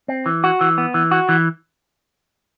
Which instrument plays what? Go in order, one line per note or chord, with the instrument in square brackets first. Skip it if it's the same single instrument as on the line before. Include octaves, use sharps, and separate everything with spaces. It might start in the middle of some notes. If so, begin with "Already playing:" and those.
[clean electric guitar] C4
E3
F#4
E3
B3
E3
F#4
E3